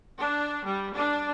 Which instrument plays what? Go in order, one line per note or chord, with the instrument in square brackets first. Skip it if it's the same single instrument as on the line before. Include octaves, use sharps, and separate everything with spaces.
[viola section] D4
G3
D4